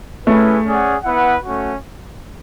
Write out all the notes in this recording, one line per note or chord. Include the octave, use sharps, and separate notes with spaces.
A3 C#4 E4 G#4 B4
C#4 G#4 D5 F#5
B3 E4 B4 F#5
A3 C#4 F#4